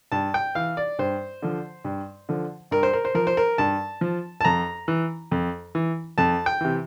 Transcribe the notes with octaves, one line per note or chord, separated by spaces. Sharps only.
G2 A5
G5
E3 F5
D5
G2 C5
D3 F3
G2
D3 F3
G2 A#4
C5
A#4
C5
F3 A#4
C5
A#4
G2 A5
F3
A5
F2 A#5
E3
F2
E3
F2 A5
G5
C3 E3